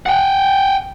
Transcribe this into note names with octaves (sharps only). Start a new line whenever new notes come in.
F#5 G5